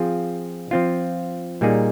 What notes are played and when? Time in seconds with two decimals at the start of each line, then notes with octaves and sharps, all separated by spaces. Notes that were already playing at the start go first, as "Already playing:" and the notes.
Already playing: F3 C4 F4 G#4
0.71 F3 C4 F4
1.61 A#2 G3 A#3 D#4 G#4